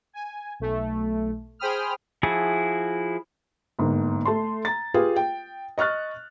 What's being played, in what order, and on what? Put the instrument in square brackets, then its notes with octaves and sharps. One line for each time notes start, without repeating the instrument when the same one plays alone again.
[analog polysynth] G#5
B1 A3
G#4 C5 G5 B5 D#6 F6
[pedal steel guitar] F3 E4 F#4 G#4 A5
[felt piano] G1 G#2 A#3
A3 A5 C6
A#5 A6
F4 G4 G#4 B4 F5
G5
D#5 C#6 F6 F#6 A6